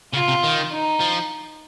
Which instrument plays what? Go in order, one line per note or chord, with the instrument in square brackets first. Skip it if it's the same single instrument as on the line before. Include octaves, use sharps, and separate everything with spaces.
[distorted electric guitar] C#3 [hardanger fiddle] F4
[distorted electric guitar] C3
D#3
[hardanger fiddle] D#4
[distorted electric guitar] F3